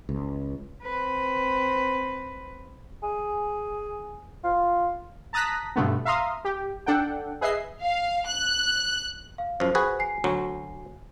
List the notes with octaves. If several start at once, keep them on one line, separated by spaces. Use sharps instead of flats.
C#2
C4 B4
G#4
F4
A5 A#5 D#6 F#6 A#6 B6
G2 B2 D3 A3 B3
E5 F5 A#5 C6 D#6
G4
D4 A4 F#5 G5
G#4 B4 D#5 E5 C7
F5
F#6
F5
F#2 F3 C5
F#4 G#4 B4
G#5 C7
D2 F#3